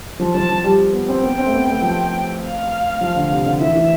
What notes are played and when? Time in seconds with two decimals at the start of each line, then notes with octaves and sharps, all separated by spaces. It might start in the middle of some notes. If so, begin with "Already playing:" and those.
0.20 F3
0.34 F3 A5
0.49 F3
0.64 G3
0.93 B3
1.09 C4
1.23 B3 G5
1.38 C4
1.46 A3
1.53 B3
1.68 A3
1.82 F3
2.41 F5
3.01 F3
3.16 D3
3.31 C3
3.46 D3
3.60 E3 E5
3.75 E3